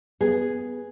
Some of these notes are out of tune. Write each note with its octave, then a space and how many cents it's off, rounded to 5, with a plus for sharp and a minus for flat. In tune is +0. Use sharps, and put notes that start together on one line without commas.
B3 +0 G#4 +0